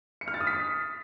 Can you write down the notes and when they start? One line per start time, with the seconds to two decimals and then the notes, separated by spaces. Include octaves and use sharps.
0.21 C#7
0.28 F6
0.34 A6
0.40 D#6
0.47 B6